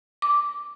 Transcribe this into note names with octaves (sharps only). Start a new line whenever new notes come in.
D6